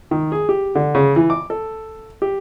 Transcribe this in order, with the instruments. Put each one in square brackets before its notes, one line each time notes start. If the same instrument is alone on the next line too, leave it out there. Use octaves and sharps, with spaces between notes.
[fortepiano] D#3
G#4
G4
D3
C#3
E3
D6
A4
G4